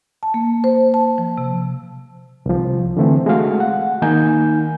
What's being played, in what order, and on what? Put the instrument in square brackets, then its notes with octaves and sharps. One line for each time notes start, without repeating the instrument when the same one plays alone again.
[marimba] A5
A#3
C5
A5
F3
C3
[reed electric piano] C2 F3
D3 E3 A3 C4
G#3 A3 F#4 F5
F#5
D#3 A#3 D#4 G#5 G6